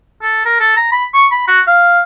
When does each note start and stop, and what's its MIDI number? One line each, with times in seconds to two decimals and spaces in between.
0.22 0.43 69
0.45 0.57 70
0.60 0.76 69
0.77 0.88 82
0.92 1.05 83
1.14 1.27 85
1.32 1.46 83
1.48 1.60 66
1.67 2.01 77